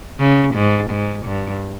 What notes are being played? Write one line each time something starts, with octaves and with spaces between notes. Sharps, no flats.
C#3
G#2
G#2
G2